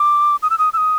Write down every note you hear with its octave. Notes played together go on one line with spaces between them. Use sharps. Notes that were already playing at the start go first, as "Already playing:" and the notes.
Already playing: D6
D#6
E6
D#6
E6
D#6